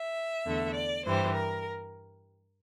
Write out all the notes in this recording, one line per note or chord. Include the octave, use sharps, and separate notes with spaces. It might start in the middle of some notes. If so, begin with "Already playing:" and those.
Already playing: E5
E2 D3 A3
D5
G2 E3 G3 C5
A#4